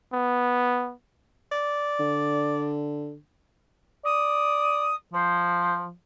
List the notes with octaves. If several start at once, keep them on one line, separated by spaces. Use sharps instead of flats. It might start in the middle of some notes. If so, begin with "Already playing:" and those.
B3
D5
D3
D5 D#6
F3 C5